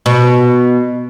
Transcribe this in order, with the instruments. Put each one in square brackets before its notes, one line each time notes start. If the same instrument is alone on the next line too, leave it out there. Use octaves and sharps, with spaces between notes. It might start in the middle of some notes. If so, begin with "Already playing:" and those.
[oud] B2